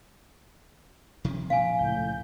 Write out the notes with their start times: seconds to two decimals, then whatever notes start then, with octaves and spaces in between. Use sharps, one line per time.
1.25 C3 F3 C#4
1.50 A#2 F3 F5 G#5
1.78 C#2 A2 G6